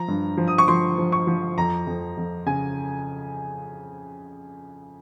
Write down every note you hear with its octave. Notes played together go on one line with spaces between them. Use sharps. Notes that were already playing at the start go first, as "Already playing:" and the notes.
Already playing: F3 A#5
G2
F3
D#6
C#6
F3 C6
F3
C#6
F3
F2 A#5
F2
F2
C#3 G#5